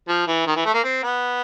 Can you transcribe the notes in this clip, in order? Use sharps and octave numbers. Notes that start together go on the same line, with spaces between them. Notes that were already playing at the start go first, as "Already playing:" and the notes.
F3
E3
D#3
E3
A3
A#3
C4
B3